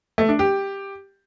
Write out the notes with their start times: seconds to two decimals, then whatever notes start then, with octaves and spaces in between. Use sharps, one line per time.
0.18 A3
0.29 D4
0.39 G4